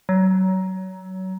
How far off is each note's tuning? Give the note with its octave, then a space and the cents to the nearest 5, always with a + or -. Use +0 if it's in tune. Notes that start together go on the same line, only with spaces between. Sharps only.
F#3 +25